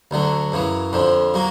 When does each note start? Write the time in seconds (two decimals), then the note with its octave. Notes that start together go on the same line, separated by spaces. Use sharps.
0.11 D2 D3 F#3
0.52 F#2 C#3 E3
0.93 F2 D3 F3
1.34 F#3 A#3